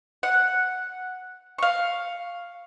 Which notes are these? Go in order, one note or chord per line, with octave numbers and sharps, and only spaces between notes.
F#5
F5 C#6